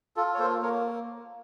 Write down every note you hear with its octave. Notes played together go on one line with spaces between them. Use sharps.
F4 A4
C#5
A#3 A4 C5
A#3 A#4 C#5